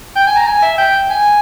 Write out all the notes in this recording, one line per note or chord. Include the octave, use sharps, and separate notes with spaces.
G5
G#5
A#5
G#5
E5
G5
G#5